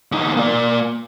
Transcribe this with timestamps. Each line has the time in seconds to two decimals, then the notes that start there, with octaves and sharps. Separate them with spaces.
0.12 E2 D#4
0.37 A#3 D5